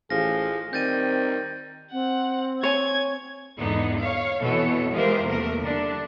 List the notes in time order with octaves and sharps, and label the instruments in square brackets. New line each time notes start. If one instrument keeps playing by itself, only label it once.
[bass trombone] A1 [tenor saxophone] F3 [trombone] G#4 [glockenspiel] A#6
[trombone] D#3 [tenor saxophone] G3 [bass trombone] C4 [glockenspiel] G6 A6 D#7
[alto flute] C4 [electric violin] F#5
[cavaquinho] C#5 G#5 [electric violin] G#6
[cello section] E2 G#2 D3 B3 D#4
C#5 F5
F2 B2 E3 A4 C#5
E3 G#3 F4 G4 A#4 C5
E2 C3 F3 A3 A#3 A#4
D3 G3 D4